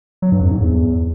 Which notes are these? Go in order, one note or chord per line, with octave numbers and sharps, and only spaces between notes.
F#3
G2
F2
G#2
E2